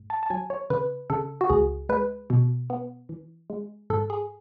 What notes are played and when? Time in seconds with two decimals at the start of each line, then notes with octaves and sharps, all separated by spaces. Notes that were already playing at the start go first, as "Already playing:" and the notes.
Already playing: G#2
0.10 A5
0.23 A5
0.30 F#3 G#5
0.50 C#5
0.70 C#3 B4
1.10 C#3 A4
1.41 F#4
1.49 C#2 G#4
1.89 G#3 B4
2.30 B2
2.70 B3
3.09 E3
3.50 G#3
3.90 G#2 A4
4.10 G#4